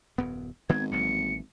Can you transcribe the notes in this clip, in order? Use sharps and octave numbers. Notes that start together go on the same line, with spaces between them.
D#1 F#2 B3
G#1 D#3 B3 C4 G#6
A1 F#3 A#3 C#7